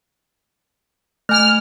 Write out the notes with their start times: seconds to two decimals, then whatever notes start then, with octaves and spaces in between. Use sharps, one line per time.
1.29 A3 G#5 F6